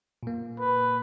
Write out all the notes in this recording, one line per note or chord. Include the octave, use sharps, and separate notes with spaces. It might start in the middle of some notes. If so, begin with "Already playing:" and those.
A#2 A#3
B4